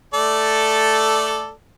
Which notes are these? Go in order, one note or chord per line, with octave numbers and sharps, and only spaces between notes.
A3 A4 D5